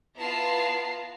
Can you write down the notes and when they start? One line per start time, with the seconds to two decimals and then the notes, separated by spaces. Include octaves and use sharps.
0.18 B3 E4 F4 A5 A#5 C7